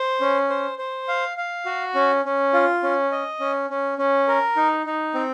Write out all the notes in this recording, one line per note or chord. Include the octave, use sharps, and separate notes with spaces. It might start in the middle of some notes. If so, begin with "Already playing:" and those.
Already playing: C5
C#4
C5
C5
F5
F5
F#4
C#4
C#4
F4
C#4
D#5
C#4
C#4
C#4
A#4
D#4
D#4
C4